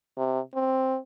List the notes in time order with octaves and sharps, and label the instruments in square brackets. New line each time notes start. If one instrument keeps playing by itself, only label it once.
[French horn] C3
C4